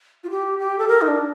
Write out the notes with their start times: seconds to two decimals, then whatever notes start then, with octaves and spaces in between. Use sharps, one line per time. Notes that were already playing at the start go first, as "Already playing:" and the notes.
0.24 F4
0.30 G4
0.59 G4
0.78 A4
0.88 A#4
1.01 D#4
1.07 D4